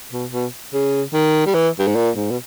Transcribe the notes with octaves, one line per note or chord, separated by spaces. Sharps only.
B2
B2
C#3
D#3
G3
E3
G2
G#2
A#2
G#2
B2